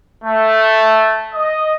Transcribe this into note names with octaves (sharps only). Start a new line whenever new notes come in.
A3
D#5